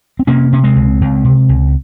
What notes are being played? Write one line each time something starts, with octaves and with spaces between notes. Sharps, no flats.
C4
C3 A#3 C#4
C3 C#4
G#3 C4
C#2
C#2
C3
C#2